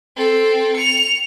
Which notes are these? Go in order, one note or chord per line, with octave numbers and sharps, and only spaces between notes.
C4 A4
C#7 F7